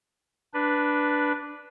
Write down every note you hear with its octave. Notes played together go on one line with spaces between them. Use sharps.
D4 B4